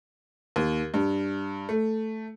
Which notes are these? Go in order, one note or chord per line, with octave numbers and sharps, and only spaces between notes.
D#2
G2
A3